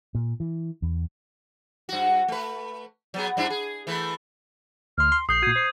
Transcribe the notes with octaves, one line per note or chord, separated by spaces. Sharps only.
A#2
E3
E2
G2 F#4
A3 B4
F#3 B3 G#4
G2 D4 E4
G#4
E3 A3 B4
D2 C6 F6
C6
A#1 D#6 G6 C7
A#2 F#4 G6 G#6 D#7
C5 C7